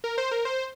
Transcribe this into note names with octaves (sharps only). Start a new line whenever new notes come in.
A#4
C5
A#4
C5